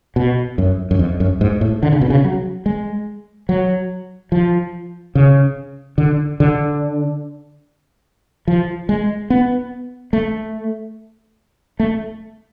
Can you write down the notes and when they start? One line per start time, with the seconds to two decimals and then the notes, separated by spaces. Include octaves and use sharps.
0.16 B2
0.58 F#2
0.91 F#2
0.99 F2
1.20 F#2
1.41 G#2
1.61 A2
1.83 D3
1.92 C#3
2.01 B2
2.10 C#3
2.24 F#3
2.66 G#3
3.49 F#3
4.32 F3
5.15 C#3
5.98 D3
6.40 D3
8.48 F3
8.89 G#3
9.30 B3
10.13 A3
11.80 A3